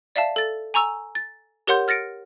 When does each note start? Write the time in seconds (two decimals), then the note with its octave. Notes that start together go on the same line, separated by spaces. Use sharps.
0.16 D5 E5 F5 A5
0.36 A4 A6
0.74 G#5 A#5 C#6 E6 F7
1.15 A6
1.67 G4 A#4 C#5 F#5 C6 G6
1.88 F6 A6 A#6 C#7 D7